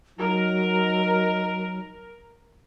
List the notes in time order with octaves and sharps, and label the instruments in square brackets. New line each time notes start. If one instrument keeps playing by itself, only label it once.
[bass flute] F#3 [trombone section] D#4 [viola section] A#4